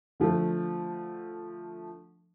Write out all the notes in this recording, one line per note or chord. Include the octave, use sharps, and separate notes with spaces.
D3 F3 A3